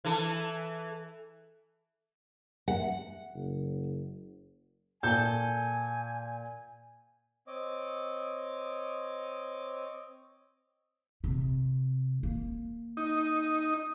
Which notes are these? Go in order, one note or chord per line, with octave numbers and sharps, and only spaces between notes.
E3 A4
F#5
F#1
A#2 A4 G5 G#5 G6
C4 C#5 D#5 D6
C3
A#3
D#4